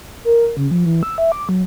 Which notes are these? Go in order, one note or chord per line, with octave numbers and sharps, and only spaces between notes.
A#4
C#3
F3
E3
E6
E5
D6
F#3